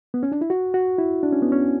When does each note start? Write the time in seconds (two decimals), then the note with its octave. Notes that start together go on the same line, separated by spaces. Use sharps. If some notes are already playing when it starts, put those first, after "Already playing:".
0.14 B3
0.23 C#4
0.32 D4
0.41 E4
0.50 F#4
0.74 F#4
0.98 E4
1.23 D4
1.33 C#4
1.42 B3
1.52 C#4